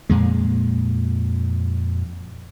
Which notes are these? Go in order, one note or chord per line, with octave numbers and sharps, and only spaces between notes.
F2 A#2 G#3